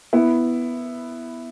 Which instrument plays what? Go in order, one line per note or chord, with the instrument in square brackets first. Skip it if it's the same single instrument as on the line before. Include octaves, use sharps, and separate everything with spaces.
[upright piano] B3 E4